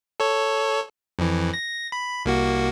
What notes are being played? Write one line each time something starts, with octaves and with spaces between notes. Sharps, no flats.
A4 C#5
F2 E3
A#6
B5
C2 A#3 F#4